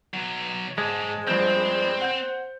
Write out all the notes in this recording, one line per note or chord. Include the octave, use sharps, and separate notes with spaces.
B1 F#3
G#2 G#3 A5
G2 F3 C4 C5 G6
F#5 G6